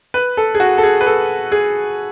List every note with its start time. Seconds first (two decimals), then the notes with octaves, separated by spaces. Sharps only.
0.14 B4
0.37 A4
0.55 G#4
0.60 F#4
0.78 A4
0.83 G#4
1.01 B4
1.06 A4
1.52 G#4